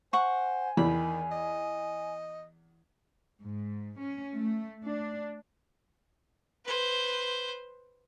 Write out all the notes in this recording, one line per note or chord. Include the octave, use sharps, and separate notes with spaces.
C5 F#5 G#5 C#6
E2 D#3 B5
D#5
G#2
C#4
A3
D4
B4 C5